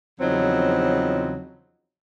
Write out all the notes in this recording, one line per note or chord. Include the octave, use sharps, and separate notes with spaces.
E2 C#3 F3 F#3 C4 D#4